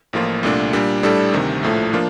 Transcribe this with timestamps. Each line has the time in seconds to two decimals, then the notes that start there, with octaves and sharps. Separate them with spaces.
0.13 A1 A2 F3 A#3 F4
0.43 C2 A#2 A3 D4
0.73 A#2 G3 D4
1.03 A2 G3 D4 A4
1.32 D2 C3 D#3
1.63 A#1 A2 F3 A3
1.93 F3 A#3 D4 F4